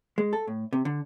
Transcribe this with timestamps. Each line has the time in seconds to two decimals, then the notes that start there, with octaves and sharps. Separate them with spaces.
0.18 G#3
0.33 A4
0.47 A2
0.73 C3
0.85 D3